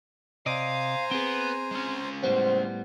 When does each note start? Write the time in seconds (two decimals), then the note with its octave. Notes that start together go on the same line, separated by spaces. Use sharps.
0.46 C3 C5 D5 D#5 F5 G#5 A#5
1.11 B3 C4 G#4
1.71 G#3 C#4
2.23 A2 G3 B3 C5